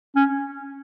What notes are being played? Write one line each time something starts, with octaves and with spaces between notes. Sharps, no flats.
C#4